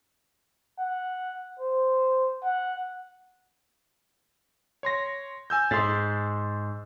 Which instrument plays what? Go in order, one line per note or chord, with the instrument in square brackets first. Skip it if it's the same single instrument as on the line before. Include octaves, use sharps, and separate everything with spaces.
[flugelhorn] F#5
C5
F#5
[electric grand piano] C#5 C6 A#6
G#5 E6 G6
[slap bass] G#2 [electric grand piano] C6 A6